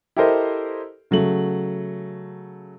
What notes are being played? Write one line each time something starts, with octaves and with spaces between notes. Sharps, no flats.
E4 G4 A4 A#4 C5 D#5
C#3 F#3 A3 F#7